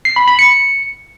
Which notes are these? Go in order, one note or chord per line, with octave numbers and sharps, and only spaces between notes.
C7
B5
B5
C#7